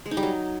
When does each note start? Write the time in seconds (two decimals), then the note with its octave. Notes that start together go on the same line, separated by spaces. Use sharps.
0.06 G#3
0.11 D#4
0.17 G3
0.23 F#3